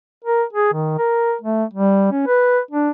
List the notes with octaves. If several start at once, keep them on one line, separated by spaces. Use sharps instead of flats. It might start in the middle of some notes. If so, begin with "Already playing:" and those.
A#4
G#4
D#3
A#4
A3
G3
C#4
B4
D4